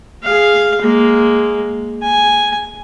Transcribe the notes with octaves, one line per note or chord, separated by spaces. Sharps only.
G#4 F5
G#3 A#3
G#5